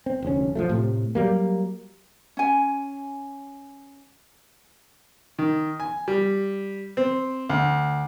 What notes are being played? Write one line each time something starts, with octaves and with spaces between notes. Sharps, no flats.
C4
F1 D2 C#4
F3 F#3 A3
A2 C3
F#3 G3 A#3
C#4 G#5
D#3
G#5
G3
C4
D2